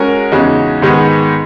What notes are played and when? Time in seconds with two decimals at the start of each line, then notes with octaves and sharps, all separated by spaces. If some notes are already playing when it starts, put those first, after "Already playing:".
Already playing: G#3 C#4 F#4 A#4
0.32 E2 C#3 G#3 D#4 F#4
0.82 G#2 D#3 G#3 B3